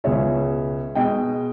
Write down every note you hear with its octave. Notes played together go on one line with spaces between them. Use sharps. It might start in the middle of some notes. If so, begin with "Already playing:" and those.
C#2 B2 G#3 C#5 E5
B2 G#3 D#5 G5